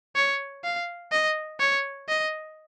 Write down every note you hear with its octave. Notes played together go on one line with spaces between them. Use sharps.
C#5
F5
D#5
C#5
D#5